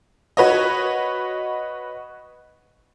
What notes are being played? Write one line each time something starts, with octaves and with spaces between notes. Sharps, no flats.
F#4 B4 C#5 D#5